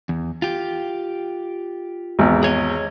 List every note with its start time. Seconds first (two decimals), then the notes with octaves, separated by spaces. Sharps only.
0.09 E2
0.42 F4 G4
2.19 G#1 E2
2.43 G#4 C#5 D#5